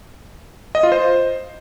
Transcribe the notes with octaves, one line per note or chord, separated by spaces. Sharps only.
D#5
F4
C5